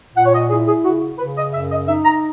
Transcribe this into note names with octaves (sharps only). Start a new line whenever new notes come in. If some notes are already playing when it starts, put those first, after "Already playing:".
A#2 F#5
C#5
D#5
E4 G#4
G#4
C#3 F#4
C#3 B4
D#5
F#2 E5
D#5
D#4 E5
A#5